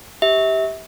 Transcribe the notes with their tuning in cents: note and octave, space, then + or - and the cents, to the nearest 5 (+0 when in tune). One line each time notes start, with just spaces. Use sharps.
G4 +0 E5 -30